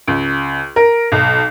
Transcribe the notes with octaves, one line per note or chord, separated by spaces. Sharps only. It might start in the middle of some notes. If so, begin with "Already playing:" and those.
C#2
A#4
B1